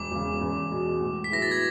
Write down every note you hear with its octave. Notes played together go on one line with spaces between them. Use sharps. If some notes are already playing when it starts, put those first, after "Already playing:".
Already playing: E1 D6
E2 C#3
E2
B2 G#3
A2
B6
F#3 B3 E4 G#4 A#6
A6
G#6